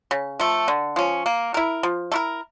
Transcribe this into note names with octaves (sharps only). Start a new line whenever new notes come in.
C#3
F3 A3
D3
F3 C#4
A#3
E4 A#4
F3
A3 E4 A#4